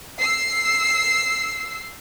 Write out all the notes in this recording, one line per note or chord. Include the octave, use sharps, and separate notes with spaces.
E6 C7